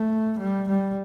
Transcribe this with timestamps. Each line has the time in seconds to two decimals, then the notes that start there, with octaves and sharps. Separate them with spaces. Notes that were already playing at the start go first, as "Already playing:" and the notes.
Already playing: A3
0.39 G3
0.68 G3